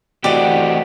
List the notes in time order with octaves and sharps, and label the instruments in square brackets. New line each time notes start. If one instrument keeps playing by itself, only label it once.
[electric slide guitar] E3 A3 C4 [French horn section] F#4 [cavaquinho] G4 [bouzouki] D5 D#5